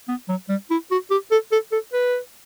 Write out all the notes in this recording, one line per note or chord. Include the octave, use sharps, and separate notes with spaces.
B3
F#3
G3
E4
F#4
G4
A4
A4
A4
B4